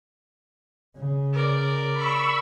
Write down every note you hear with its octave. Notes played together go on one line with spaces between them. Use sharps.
C#3
A#4 D5
B5 C#6 E6